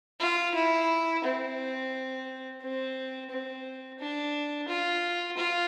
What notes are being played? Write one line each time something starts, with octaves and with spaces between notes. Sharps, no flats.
F4
E4
C4
C4
C4
D4
F4
F4